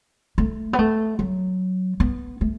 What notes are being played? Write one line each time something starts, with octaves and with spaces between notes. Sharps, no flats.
A3
B3
A3
F#3
B3
A3